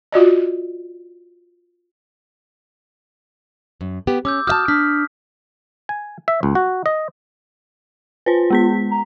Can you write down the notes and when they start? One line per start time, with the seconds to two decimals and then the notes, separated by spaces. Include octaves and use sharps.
0.12 F4 F#4 D5 D#5
3.81 F#2
4.07 B3 G4
4.25 C#4 D6 E6 G6
4.47 F#4 E5 A5 D#6 F6 G6
4.68 D4 F6 B6
5.89 G#5
6.28 E5
6.43 C#2
6.55 F#4
6.86 D#5
8.26 F4 B4 C5
8.50 G#3 B3 B6
8.91 A#5